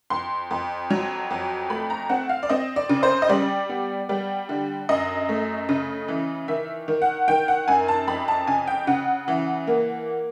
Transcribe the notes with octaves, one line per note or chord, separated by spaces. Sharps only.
F2 C6
F2
F#3
F2
A3 B5
A#5
C4 F#5
F5
D5
C4 D#5
D5
C#3
C5
D#5
G3 D5
B3
G3
D3
F#2 D#5
A3
C#3
E3
D#3 E5
D#3
F#5
D#3 G5
F#5
F#2 G#5
A5
F2 B5
A5
C#3 G#5
G5
C#3 F#5
E3
A#3